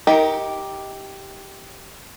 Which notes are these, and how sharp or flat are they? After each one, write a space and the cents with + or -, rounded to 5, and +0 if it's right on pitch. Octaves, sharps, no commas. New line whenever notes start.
D#4 +25 G4 +0 A#4 +0